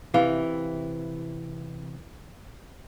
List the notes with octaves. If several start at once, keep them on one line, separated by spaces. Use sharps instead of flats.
C3 E3 F5